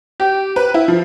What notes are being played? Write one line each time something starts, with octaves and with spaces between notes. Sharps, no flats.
G4
B4
E4
F3